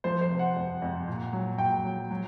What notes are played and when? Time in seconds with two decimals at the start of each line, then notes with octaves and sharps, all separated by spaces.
0.04 F3 C5
0.21 C5
0.30 C3
0.39 F#5
0.56 F2
0.82 F2
1.08 A#2
1.33 F#3
1.58 A#2 G5
1.84 F#3
2.11 F#3